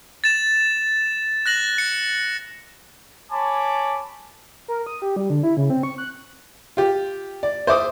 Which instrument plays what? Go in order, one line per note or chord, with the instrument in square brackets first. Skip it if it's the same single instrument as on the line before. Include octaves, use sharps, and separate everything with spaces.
[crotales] A6 E7
F#6 A#6 F#7
C#7
[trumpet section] C#5 G#5 A5 B5 D6
[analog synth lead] A#4
D#6
G4
G3
D3
E4
C#3
C4
C#6
F#6
[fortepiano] F4 G4
D5
C5 E5 D6 D#6